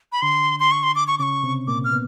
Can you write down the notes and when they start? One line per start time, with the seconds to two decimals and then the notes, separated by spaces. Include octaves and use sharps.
0.12 B5
0.22 D3 D4 C6
0.60 C6
0.72 C#6
0.83 C6
0.95 D6
1.08 C#6
1.19 C#3 C#4 C#6 D6
1.43 C3 C4
1.67 A#2 A#3 D6
1.84 F6
1.92 B3